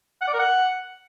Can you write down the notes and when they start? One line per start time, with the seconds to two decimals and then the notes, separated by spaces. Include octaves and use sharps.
0.22 F#5
0.28 D5
0.34 A#4
0.40 F#5